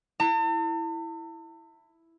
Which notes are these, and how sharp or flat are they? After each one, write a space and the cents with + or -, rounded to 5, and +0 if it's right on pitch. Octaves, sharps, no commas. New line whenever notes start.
E4 +0 A5 +45